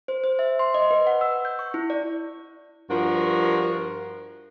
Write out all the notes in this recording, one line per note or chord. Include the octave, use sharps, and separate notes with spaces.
C5
C5
E5
C6
D#5
B4
F#5
E6
G6
C#6
E4
D5
G2 F3 F#4 A#4